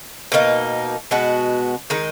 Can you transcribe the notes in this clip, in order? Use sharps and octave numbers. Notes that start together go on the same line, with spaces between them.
B2 A#3 D#4
B2 G#3 B3 F#4
D#3 G#3 D#4